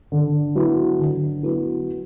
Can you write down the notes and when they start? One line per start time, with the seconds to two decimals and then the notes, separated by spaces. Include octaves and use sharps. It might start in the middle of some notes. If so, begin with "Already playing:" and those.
0.12 D3
0.55 F#3 B3 E4
0.99 D3
1.43 F#3 B3 E4